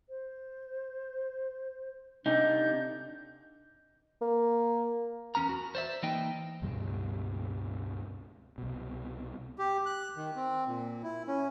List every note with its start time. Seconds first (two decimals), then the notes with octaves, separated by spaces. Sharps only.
0.09 C5
2.26 C3 D4 D#4 G6
4.22 A#3
5.35 E2 C#4 A#4 A#5
5.49 F#4
5.75 C5 D5 E5
6.03 E3 A#3 D#4 D#5 G5
6.62 C#2 G2 B2 G3
8.58 C2 B2
9.58 G4
9.86 F#6
10.17 D#3
10.36 C4
10.67 A#2
11.03 E4
11.27 C#4